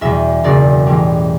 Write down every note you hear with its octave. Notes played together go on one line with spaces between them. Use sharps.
E2 B2 G3 E5
F#1 E2 B2 F#3 D5
A1 A2 G3